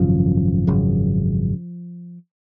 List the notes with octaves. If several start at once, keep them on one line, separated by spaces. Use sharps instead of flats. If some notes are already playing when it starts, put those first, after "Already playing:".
Already playing: G#1 F#2 C#3 F3
G#1 F#2 C#3